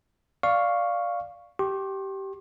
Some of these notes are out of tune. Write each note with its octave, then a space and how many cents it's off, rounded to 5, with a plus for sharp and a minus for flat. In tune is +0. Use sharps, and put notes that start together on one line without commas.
D5 +0 F5 +0 C#6 +0
G4 -15 C6 +45